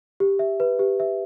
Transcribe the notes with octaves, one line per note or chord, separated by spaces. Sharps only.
G4
E5
B4
G4
E5